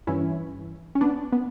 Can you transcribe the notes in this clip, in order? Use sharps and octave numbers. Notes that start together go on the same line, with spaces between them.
G2 E3 C#4 E4
C#4
B3 D4
B3